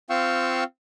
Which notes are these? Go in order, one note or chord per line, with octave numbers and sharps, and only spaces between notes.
C4 F4 F5 G5 C#6 E6